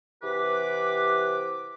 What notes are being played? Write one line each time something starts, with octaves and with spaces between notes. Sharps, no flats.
C3 E3 G4 B4 F#5 D6